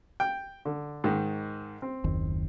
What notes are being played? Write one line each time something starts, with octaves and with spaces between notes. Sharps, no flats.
G5
D3
G#2 D#3
C4
F#1 D#2